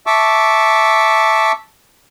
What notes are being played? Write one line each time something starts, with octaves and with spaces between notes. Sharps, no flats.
E5 A5 C#6 D6 E6